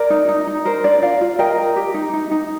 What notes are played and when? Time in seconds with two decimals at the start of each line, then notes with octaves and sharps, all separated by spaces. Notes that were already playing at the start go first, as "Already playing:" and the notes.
Already playing: A#4 D5
0.10 D#4
0.29 D#4
0.47 D#4
0.65 A#4 C5
0.84 D4 D5
1.02 F4 D5 F5
1.21 F4
1.39 A#4 D#5 G5
1.58 A#4
1.76 G4
1.94 D#4
2.13 D#4
2.31 D#4